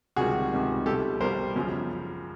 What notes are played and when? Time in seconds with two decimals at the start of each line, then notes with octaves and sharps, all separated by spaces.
0.16 C#2 C3 D#3 G3 F#4 G#4
0.52 C#2 C3 D#3 G3
0.86 C2 B2 G3 G4 A4
1.20 C2 B2 G3 A#4 C5
1.55 G#1 F#2 C#3 F3